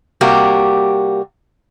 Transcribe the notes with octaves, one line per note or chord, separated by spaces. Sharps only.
C3 G3 A#3 F#4 G4